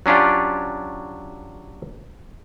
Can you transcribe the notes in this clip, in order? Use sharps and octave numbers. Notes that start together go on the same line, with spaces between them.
F#3 C#4 D4 F4 G4